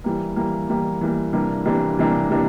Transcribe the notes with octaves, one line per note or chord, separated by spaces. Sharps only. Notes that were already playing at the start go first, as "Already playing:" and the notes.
E3 G3 A#3
E3 G3 A#3
E3 G3 A#3
E3 G3 A#3
C3 E3 G3 A#3 D4
C3 E3 G3 A#3 D4
C3 E3 G3 A#3 D4
C3 E3 G3 A#3 D4